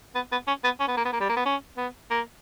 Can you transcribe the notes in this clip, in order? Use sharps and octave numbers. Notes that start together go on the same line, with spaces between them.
B3
B3
C#4
B3
C#4
B3
A#3
B3
A#3
G3
A#3
B3
C#4
B3
A#3